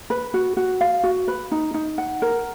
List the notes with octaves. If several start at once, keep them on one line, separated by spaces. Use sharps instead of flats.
B4
F#4
F#4
F5
F#4
B4
D#4
D#4
F#5
A#4